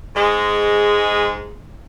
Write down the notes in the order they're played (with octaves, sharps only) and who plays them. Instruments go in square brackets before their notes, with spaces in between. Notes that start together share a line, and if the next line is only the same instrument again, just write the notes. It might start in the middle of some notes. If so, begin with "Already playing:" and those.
[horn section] G#2 G#3